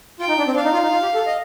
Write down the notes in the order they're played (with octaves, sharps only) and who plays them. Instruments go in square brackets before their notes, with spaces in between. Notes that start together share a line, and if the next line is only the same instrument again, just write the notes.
[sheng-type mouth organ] F4 [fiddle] G5
[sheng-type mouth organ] D#4
D4
C4
[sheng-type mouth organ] D4 [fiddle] F5
[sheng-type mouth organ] D#4
F4
D#4
F4
G4
A4
D#5